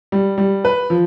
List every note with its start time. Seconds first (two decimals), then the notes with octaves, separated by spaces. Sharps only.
0.12 G3
0.38 G3
0.65 B4
0.90 F3